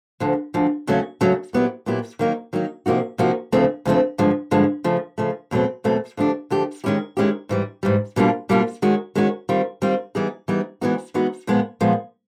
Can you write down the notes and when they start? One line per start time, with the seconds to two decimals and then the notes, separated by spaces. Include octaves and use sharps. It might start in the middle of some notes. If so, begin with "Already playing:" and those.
0.20 D2 D3 F3
0.54 D2 D3 F3
0.87 D#2 C#3 F#3 A3 C#4
1.21 D#2 C#3 F#3 A3 C#4
1.53 A#2 F#3 B3 E4 G4
1.86 A#2 F#3 B3 E4 G4
2.19 D#3 F#3 A#3 D#4
2.53 D#3 F#3 A#3 D#4
2.86 C3 F3 A#3 D#4 F#4
3.18 C3 F3 A#3 D#4 F#4
3.52 D2 C#3 F3 A3 C4
3.85 D2 C#3 F3 A3 C4
4.18 G2 D3 F3 G#3
4.51 G2 D3 F3 G#3
4.84 C#3 F3 A3
5.18 C#3 F3 A3
5.51 E2 B2 F#3 A3 C4
5.84 E2 B2 F#3 A3 C4
6.17 D3 F3 A3 D4 G4
6.50 D3 F3 A3 D4 G4
6.84 D#3 G#3 C#4 E4 G4
7.17 D#3 G#3 C#4 E4 G4
7.49 G#2 E3 G3
7.83 G#2 E3 G3
8.16 B2 G3 A#3 D4 F4
8.49 B2 G3 A#3 D4 F4
8.82 D#3 G#3 C#4 F#4
9.15 D#3 G#3 C#4 F#4
9.49 D#3 G3 C4 F4
9.82 D#3 G3 C4 F4
10.15 E3 G3 B3 D#4 G#4
10.48 E3 G3 B3 D#4 G#4
10.81 E3 G#3 B3 D#4 F#4
11.14 E3 G#3 B3 D#4 F#4
11.47 A#2 F3 G#3 B3
11.81 A#2 F3 G#3 B3